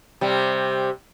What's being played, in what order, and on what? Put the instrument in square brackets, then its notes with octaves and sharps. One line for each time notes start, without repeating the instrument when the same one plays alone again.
[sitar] C3 G3